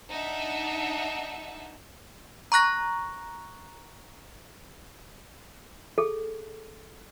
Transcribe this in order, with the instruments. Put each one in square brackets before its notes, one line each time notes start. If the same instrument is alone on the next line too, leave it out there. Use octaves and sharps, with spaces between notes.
[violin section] D4 D#4 E5 F#5
[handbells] A#5 C#6 F#6 A#6
[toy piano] G#4 A4